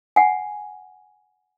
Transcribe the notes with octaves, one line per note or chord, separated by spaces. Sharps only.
F#5 G#5